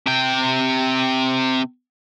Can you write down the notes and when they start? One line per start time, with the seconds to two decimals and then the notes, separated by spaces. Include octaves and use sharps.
0.07 C3 G5